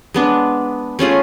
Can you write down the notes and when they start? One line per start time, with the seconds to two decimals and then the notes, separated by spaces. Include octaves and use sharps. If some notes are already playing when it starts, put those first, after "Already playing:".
0.14 G#3 B3 D4
0.99 A3 C#4 F4 G#4